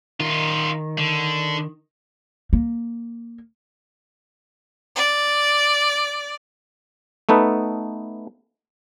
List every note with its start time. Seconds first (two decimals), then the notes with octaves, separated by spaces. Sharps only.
0.20 D#3 D#4 F4
0.98 D3
2.53 A#3
4.96 D5
7.29 A3 B3 D#4 A4 B4